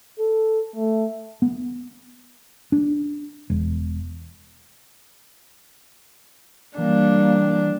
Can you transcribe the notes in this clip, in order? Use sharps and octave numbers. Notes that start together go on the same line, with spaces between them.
A4
A3
B3
D4
E1
E3 G3 A#3 D4